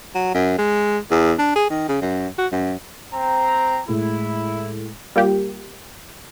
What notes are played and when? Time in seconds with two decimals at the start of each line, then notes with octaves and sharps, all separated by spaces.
0.15 F#3
0.34 F#2
0.58 G#3
1.11 E2
1.39 D4
1.56 G#4
1.70 D#3
1.89 C#3
2.01 F#2
2.38 F#4
2.52 F#2
3.13 C4 A#5
3.88 A2 G#3 E4
5.16 G3 A#3 F4 G4